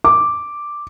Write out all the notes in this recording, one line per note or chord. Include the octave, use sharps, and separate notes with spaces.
D6